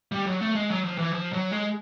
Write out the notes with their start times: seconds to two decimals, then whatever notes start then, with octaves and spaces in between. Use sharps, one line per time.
0.12 G3
0.26 F#3
0.41 A3
0.55 G#3
0.70 F#3
0.85 F3
0.98 E3
1.13 F3
1.33 F#3
1.52 G#3